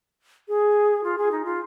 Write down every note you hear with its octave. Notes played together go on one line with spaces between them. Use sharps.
G#4
F4
G#4
D#4
F4